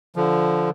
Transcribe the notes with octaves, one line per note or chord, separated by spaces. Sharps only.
D3 F3